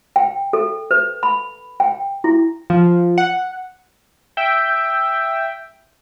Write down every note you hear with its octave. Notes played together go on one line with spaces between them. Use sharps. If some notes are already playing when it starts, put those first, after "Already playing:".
G5
A4
B4
B5
G5
E4
F3
F#5
E5 G5